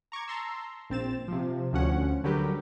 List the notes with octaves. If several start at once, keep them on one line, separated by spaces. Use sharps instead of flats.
A#5 C#6 D6 G#6
A5 A#5 C6 E6
A#1 C4 A6 E7
C3 F3
D2 F3 C#4 F#5
D3 F#3 G3 G4 A#4 B4